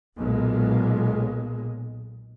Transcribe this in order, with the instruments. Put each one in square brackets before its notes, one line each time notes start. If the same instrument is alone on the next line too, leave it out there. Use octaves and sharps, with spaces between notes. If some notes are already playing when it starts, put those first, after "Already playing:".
[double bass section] B1 A#2 G#3